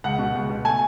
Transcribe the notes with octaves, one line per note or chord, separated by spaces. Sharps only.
C#2 F#5
B2
C#2
B2
A3 G#5